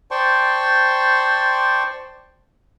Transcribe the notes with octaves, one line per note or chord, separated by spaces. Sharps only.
C5 D5 G5 A5 C6 C#6